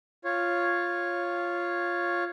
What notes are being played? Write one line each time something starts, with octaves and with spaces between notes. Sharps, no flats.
F4 C#5